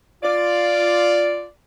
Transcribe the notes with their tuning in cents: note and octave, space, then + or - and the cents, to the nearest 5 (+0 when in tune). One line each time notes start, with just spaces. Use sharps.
F4 +0 D5 +0